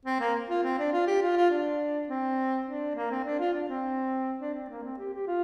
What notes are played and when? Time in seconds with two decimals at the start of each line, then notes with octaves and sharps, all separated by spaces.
0.05 C4
0.20 A#3
0.48 F4
0.63 C4
0.78 D4
0.93 F4
1.07 G4
1.22 F4
1.37 F4
1.50 D4
2.09 C4
2.67 D4
2.95 A#3
3.11 C4
3.24 D4
3.39 F4
3.53 D4
3.69 C4
4.40 D4
4.55 C4
4.69 A#3
4.83 C4
4.98 G4
5.13 G4
5.27 F4